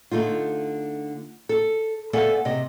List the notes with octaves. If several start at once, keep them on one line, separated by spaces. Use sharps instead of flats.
D3 A3 D#4 F4
A4
A3 B3 A4 D5 F5 G#5
C3 D#5